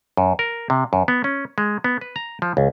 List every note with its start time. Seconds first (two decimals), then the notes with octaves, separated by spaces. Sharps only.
0.17 F#2
0.39 A#4
0.70 C3
0.93 F#2
1.08 B3
1.24 C#4
1.58 G#3
1.84 B3
2.01 B4
2.16 A#5
2.42 F3
2.57 C#2